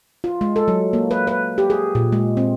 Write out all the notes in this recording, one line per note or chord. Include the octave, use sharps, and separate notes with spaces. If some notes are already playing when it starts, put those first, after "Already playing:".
F4
G#3
A4
F#3
A#3
B4
B4
G4
G#4
A#2
G#3
C4